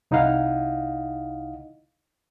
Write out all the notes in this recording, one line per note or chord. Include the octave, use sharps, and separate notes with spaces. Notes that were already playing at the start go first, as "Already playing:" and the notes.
C2 D#4 E4 D#5 F5 F#5